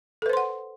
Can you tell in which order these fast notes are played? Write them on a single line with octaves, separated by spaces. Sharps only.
A4 B4 C5 C6 F#5